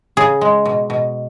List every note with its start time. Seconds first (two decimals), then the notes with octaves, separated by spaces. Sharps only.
0.17 C#3 G#4
0.41 G#3
0.66 B2
0.90 B2